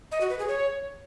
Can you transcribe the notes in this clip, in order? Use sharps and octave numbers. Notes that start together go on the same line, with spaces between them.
D#5
F#4
B4
G#4
C#5